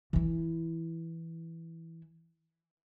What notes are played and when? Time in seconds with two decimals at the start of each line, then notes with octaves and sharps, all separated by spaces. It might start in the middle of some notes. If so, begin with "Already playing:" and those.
0.13 E3 E4